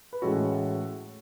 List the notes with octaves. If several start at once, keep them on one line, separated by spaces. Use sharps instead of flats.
B4
A2 E3 G#3 C#4 F#4 A4